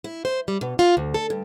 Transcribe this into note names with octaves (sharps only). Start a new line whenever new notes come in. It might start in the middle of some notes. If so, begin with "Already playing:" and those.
E4
C5
G3
B2
F4
D2
A4
G2